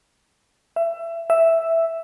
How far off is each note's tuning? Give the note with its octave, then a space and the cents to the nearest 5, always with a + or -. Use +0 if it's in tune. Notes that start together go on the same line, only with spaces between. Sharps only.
E5 +25
E5 +0